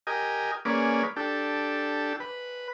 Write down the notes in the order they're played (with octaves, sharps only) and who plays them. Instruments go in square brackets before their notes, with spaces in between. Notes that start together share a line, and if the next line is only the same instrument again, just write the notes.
[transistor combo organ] G4 A#4 D#5 G#5
A#3 C#4 G#4 B4 D5
D4 G4 A4
B4